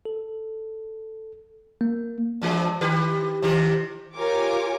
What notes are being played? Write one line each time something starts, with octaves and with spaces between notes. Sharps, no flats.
A4
A#3
G2 E3 G#3
D#3 G4 B4
C3 D#3 G4
F4 G4 A#4 C#5 G#5 D6